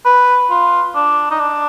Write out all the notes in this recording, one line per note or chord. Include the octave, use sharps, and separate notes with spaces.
B4
F4
D4
D#4
D4